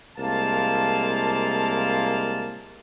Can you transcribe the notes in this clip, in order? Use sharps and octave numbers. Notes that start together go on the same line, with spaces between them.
C2 G#3 A#3 F5 A5